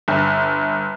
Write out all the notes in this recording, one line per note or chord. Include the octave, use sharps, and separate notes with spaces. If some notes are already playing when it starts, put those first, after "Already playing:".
G1